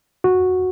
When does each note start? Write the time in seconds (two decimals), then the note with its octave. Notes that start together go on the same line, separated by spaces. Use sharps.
0.24 F#4